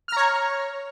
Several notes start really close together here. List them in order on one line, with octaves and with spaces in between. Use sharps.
F6 A#5 C#5